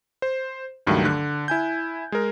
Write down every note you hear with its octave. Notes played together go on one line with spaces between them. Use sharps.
C5
C#2 G2 D#3 F#3 A3
D3 F#6
E4 G#5 G6
G#3 A#4